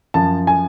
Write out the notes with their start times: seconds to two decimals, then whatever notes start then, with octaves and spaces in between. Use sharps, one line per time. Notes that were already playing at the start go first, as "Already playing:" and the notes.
0.14 F#2 F3 A5
0.47 G#5